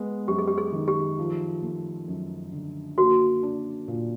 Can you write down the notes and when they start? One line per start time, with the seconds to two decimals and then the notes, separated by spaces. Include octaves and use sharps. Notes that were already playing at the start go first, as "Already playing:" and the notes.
Already playing: G#3 B3
0.28 F#2 G4
0.38 G#4
0.48 G4
0.58 G#4
0.72 D#3
0.88 G4
1.18 F3
1.63 A3
2.08 F#2
2.52 D3
2.98 A#3 F#4
3.43 D4
3.88 A#2